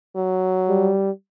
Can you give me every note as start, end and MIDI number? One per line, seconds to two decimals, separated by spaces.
0.16 0.91 54
0.69 1.11 55